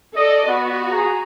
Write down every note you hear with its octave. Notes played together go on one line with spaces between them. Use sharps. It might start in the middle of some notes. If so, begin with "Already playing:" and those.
A4 D5 D#5
B3 F#4
G#4 A#5